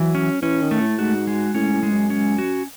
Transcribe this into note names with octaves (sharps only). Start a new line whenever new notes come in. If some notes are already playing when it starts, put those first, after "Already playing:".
Already playing: E3 F#3
C#4
E3 C#4
D#3
A3
A2
G#2 F#4
G#3
A2 C#4
A2
G#3
F#2
C#4
F#4